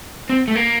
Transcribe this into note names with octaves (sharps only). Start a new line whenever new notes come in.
C4
A3
A#3